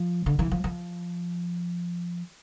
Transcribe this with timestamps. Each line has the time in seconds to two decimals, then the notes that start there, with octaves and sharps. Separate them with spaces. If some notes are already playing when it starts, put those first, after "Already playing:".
Already playing: F3
0.26 D3
0.39 E3
0.52 F3
0.64 F3